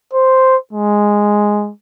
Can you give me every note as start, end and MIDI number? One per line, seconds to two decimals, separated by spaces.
0.13 0.56 72
0.73 1.71 56